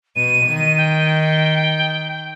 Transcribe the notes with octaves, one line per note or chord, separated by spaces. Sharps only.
B2 D#7
D#3
G5